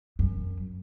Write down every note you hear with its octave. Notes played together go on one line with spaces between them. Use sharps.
F#2